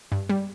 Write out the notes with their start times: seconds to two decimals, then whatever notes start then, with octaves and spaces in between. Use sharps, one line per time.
0.12 G2
0.29 G3